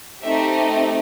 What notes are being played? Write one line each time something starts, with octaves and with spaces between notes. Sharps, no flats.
A3 C4 D#4 G4 E5